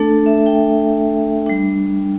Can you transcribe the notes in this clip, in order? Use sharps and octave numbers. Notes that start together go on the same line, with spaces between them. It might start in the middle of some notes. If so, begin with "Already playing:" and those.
Already playing: A3 D4 A4
E5
G5
G3 D4